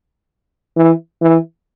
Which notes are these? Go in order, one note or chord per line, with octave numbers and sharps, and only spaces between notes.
E3
E3